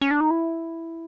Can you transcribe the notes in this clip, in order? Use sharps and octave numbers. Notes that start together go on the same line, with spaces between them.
C#4
D4
D#4
E4